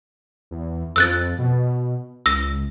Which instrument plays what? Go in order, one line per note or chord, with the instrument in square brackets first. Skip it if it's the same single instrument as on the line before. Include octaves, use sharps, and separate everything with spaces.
[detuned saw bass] E2
[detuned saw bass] F2 [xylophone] E6 F#6 A6
[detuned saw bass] B2
[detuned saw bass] C#2 [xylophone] E6 A#6